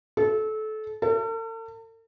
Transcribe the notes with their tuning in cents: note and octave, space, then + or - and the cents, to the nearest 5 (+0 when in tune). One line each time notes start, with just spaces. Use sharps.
A4 -25
A4 +45